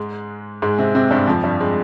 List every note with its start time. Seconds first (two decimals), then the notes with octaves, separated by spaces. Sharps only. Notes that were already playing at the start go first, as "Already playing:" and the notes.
Already playing: G#2 G#3
0.62 G#2 G#3
0.78 C3 C4
0.95 C3 C4
1.11 G2 G3
1.27 F2 F3
1.44 G2 G3
1.60 G#3